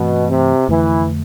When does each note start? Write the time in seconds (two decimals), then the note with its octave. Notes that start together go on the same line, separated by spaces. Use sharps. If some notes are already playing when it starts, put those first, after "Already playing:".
Already playing: G2 B2 E3 A3 C4
0.28 C3
0.68 F2 D3 E3 A3